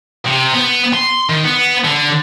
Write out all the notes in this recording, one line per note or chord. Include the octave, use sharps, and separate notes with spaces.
C3
B3
C6
D#3
B3
D3